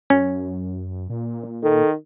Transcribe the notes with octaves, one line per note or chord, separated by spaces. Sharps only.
F#2 C#4
A#2
D#3 A4